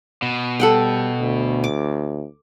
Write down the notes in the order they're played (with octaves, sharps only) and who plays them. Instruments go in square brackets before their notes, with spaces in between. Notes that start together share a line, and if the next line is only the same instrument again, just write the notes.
[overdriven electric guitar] B2
[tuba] G3 [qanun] A4 F#5 G5
[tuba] D2
[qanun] D6